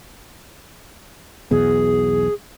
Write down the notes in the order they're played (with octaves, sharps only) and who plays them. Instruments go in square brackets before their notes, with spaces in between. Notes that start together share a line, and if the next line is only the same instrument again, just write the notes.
[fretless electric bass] B1 E2 B2 [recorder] G#4